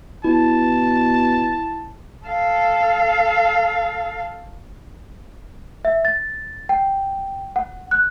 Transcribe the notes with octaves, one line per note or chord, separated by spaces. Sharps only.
B2 E4 A5
A4 F5
E5
A6
G5
F#5
F#6